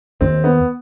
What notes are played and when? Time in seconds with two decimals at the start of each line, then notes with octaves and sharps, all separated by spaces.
0.21 D#2 C4
0.44 B3